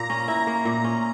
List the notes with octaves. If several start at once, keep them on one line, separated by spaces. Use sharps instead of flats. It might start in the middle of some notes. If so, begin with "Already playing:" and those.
Already playing: A#2 A#3 A#5 A#6
C#4
E4
A#3
A#2
C#4